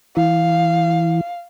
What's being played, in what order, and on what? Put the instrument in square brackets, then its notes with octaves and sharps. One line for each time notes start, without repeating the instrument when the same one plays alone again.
[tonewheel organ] E3 [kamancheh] F5